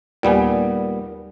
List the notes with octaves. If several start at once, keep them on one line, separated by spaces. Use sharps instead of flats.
D#2 A#2 G3 B3 G#5